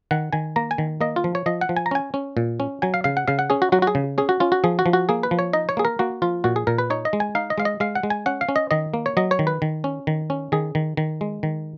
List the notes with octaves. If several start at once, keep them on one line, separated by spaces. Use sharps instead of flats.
D#3 F#5
D#3 G#5
A#3 A#5
G#5
D#3
A#3 D#5
F4
F3
C#5
F3 D#5
F#5
F3
G#5
A#5
C#4 G#5
C#4
A#2
C#4
F#3 G#5
F5
C#3 F5
F#5
C#3 F5
F#5
C#4 G#4
F#4
F#3 F#4
F#4
G#4
C#3
C#4 G#4
F#4
C#4 F4
F#4
F3 G#4
F#4
F3
F#4
A#3 G#4
B4
F3
C#5
D#4 D#5
C#5
A#3 G#4
A#4
A#3 F#4
F3 F4
A#2 F#4
G#4
A#2 A#4
B4
D#4 C#5
D#5
G#3
G#5
D#4 F5
D#5
G#3 F5
D#5
G#3 F5
F#5
G#3
G#5
C#4 F#5
F5
C#4
D#5
D#3 D#5
A#3
C#5
F#3 D#5
C#5
D#3
B4
D#3
C#4
D#3
C#4
D#3 G#4
D#3
D#3
G#3
D#3